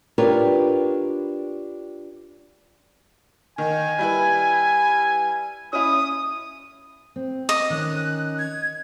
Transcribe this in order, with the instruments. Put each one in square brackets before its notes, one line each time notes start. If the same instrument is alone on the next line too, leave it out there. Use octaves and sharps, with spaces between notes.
[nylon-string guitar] D4 F4 G4 A#4 B4 C#5
[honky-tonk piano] D#3 [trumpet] G#5
[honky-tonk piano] G3 E4 B4
[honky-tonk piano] C#4 E4 [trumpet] D#6
[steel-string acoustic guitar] C4
[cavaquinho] D#5 [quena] D6
[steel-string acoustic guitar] D#3 C#4 [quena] F#6
[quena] G#6